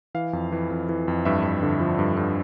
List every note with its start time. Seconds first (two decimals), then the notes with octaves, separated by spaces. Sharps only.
0.15 E3 F5
0.33 F2
0.52 E3
0.71 F2
0.89 E3
1.08 F2
1.25 G2 E5
1.43 G2
1.63 D3
1.80 F3
1.99 G2
2.17 G2